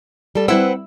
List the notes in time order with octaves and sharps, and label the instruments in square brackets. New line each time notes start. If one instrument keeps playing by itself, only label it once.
[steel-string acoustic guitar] G3 A4
[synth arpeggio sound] G3 E4 E6 [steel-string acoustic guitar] C4 B4 F#5